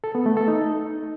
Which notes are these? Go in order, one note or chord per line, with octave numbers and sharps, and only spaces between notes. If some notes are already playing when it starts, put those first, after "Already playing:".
A4
B3
A3
A4
D#4